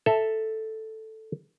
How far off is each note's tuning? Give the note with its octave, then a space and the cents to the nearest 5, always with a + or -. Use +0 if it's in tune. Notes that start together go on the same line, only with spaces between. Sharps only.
A4 +0 E5 +0 A#5 +0